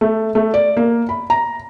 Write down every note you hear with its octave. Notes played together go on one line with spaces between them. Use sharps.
A3
A3
D5
A#3
B5
A#5